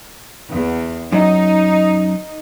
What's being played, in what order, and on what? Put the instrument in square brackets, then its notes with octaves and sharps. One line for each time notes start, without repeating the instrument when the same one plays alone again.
[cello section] E2
[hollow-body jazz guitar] F#2 [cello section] D#4